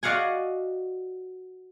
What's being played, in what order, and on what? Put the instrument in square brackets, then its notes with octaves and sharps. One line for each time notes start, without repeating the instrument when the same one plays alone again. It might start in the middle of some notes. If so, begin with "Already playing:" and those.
[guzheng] F#4 D5 D#5 F5 F#5 G#5